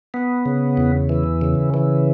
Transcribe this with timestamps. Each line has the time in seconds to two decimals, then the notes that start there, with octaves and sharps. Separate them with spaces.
0.14 B3
0.46 C#3
0.77 E2
1.09 E3
1.42 C#3
1.74 E3